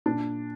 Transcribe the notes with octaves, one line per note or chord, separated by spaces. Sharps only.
A#2 D4